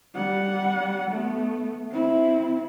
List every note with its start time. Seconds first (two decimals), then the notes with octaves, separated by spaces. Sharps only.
0.14 G3 F#5
1.11 A3 B3
1.91 C4 E4